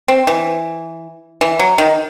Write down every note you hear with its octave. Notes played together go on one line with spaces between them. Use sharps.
C4
E3
E3
F#3
D#3